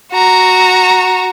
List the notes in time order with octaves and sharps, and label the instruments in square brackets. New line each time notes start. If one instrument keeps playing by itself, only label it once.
[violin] F#4 A#5